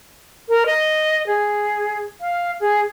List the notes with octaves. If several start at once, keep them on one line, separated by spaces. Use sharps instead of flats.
A#4
D#5
G#4
F5
G#4